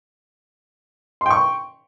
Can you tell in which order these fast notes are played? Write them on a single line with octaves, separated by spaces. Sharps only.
C6 G5 C#6